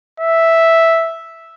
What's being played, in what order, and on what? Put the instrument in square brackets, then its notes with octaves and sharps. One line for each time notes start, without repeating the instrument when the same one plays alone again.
[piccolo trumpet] E5